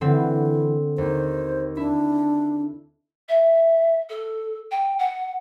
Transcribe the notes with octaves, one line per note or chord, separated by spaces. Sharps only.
D3 E3 B3 C4
D#2 C5
D4 E4
E5
A4
G5
F#5